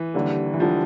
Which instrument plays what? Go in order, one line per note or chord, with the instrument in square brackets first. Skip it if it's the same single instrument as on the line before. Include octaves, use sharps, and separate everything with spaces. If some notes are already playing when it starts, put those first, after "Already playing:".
Already playing: [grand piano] E3
[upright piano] D#2 D3 G3
[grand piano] E3
[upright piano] D3 G3 [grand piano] F3